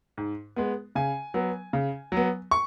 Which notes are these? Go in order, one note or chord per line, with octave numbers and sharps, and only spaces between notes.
G#2
G#3 B3
C#3 G#5
F#3 B3
C#3
F#3 B3
C#6